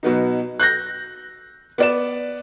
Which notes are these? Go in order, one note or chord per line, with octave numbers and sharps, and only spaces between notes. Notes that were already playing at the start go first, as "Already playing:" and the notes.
B2 F#3 B3 D#4
F#6 G6 A#6
B3 D5 E7